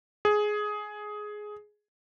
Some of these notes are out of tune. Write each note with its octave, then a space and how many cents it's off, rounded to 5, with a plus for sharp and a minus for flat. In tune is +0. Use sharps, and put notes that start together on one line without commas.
G#4 +10